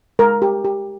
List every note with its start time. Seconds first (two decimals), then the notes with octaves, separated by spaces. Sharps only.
0.19 G#3 A#4
0.42 G4
0.64 G4